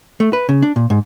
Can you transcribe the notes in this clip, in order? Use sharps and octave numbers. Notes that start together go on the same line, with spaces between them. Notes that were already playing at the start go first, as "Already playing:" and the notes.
A3
B4
C#3
D4
A#2
G#2